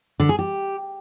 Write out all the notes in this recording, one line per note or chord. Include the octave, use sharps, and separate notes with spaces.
D3
G#4
G4